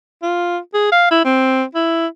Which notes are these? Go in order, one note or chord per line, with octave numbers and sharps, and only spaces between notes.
F4
G#4
F5
E4
C4
E4